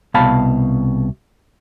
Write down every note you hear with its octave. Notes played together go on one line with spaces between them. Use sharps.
C2 B2 F5 A5 B5